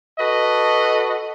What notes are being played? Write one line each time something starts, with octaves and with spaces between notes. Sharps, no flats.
F#4 A4 B4 D#5